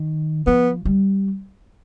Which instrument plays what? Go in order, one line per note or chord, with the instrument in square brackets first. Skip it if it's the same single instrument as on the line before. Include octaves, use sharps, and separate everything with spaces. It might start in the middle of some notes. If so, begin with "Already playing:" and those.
Already playing: [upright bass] D#3
[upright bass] F3 [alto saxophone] B3
[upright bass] G3